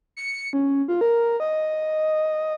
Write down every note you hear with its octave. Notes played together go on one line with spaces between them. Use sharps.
C#7
C#4
F4
A#4
D#5